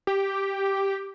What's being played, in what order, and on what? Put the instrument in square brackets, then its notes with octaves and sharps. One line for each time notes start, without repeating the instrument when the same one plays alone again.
[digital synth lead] G4